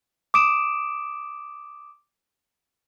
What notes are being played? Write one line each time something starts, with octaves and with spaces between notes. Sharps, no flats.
D6 D#6 D7 E7